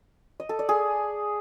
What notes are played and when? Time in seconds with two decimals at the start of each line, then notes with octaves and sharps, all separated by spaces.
0.40 D#5
0.49 A4
0.59 D5
0.69 G#4